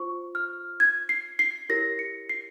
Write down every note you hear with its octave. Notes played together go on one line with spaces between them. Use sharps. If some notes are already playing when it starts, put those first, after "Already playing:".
Already playing: F4 C5 C#6
F6
G#6
C7
C7
E4 G4 A#4 C#5 A#6
C#7
C7